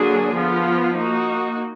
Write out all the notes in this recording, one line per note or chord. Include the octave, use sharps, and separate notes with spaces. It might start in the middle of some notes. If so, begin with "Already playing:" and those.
Already playing: D3 F#3 A#3 D4 G#4
F3 B3 F4
A#3 D#4 F#4